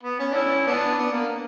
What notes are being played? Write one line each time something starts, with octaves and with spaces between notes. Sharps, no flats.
B3
C#4
D4
C#4 E4
B3 D4
B3
A#3